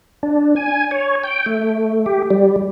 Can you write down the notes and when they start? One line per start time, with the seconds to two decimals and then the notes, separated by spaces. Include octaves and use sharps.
0.23 D4
0.56 G#5
0.91 C#5
1.24 G5
1.46 A3
2.06 G4
2.30 G3